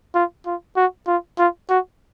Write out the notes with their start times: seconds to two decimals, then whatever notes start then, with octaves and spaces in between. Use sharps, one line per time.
0.15 F4
0.46 F4
0.76 F#4
1.07 F4
1.38 F4
1.69 F#4